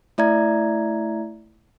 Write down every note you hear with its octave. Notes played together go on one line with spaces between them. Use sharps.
A3 E4 D5 E5 A#5 G#6